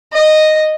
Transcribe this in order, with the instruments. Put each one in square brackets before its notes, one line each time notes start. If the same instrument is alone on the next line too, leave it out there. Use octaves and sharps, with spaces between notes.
[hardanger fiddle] D#5